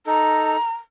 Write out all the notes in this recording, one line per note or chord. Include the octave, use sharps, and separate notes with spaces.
D#4 A4 A#5